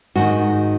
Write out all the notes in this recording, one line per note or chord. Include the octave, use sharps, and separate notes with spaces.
G#2 D#3 F#4